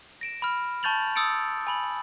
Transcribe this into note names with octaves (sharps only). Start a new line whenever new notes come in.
A#6 D7 E7
B5 F6
A5 C#6 G6 A6 F7 F#7
D#6 E6 A6 C#7 D7
G#5 B5 F#7